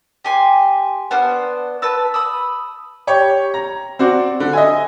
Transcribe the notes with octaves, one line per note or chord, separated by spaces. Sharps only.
G4 G#5 C6
B3 D4 C5 F6
B4 A5 E6
B5 D#6 E6
G4 C#5
A#5
C4 F#4 D5
D3
D#5 E5 G#5